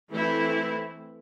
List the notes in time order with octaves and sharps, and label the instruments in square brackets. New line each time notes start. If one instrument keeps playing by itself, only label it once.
[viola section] E3 A3 C4 E4